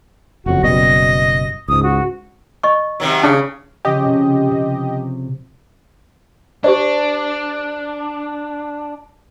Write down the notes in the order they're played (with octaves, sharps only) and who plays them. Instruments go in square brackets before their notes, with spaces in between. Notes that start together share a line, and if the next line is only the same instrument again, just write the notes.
[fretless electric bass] F#1 F2 F#3 [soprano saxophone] F#4
[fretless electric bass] F#1 B2 G3 [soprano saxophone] D#5 [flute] A#6
[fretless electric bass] C#2 G#2 [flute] D#6
[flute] F#4
[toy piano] D#5 C#6
[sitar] C3 D#3 F#3
[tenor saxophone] C#3 [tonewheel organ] D4
[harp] C#3 F3 C#4 [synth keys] G4 D#5
[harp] C3
C3
[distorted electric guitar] D4 [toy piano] G4 C5 D5